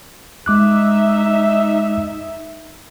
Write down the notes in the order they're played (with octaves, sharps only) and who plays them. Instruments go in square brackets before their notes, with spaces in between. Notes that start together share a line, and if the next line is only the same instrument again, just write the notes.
[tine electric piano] G#3 D6 F#6 [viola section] D#4 E5